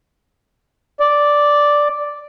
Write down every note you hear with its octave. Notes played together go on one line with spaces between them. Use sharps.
D5